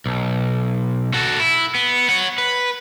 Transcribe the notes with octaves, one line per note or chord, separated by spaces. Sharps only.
B1
F#4 A4
E4
B3
C#5 F#5
B4